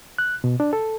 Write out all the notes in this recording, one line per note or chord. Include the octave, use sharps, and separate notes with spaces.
F#6
B2
D4
A4